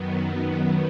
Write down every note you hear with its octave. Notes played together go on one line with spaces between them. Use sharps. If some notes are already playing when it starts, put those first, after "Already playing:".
Already playing: F#2 D#3 F#3 B3